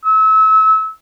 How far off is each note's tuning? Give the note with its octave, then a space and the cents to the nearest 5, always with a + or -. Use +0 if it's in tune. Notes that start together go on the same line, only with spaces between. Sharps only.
E6 -30